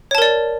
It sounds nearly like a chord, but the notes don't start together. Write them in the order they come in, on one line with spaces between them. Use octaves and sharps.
C#5 A5 A#4 D5